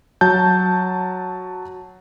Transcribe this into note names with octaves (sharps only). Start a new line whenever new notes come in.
F#3 A5 G6